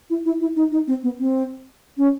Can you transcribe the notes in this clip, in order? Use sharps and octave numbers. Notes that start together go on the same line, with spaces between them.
E4
E4
E4
D#4
D#4
C4
B3
C4
C#4